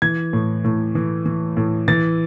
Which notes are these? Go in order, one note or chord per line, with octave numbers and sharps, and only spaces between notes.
E3 G#6
A2
A2
E3
E3
A2
E3 A6